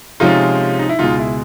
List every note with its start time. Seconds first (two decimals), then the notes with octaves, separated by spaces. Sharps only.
0.20 C3 F3 G#3 C#4 D#4 F4
0.79 D#4
0.89 E4
0.99 C#2 B2 G#3 D#4 F4
1.19 E4